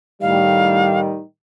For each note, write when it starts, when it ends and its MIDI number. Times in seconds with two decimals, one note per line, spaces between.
0.21 1.20 45
0.21 1.20 51
0.21 1.20 55
0.21 0.99 77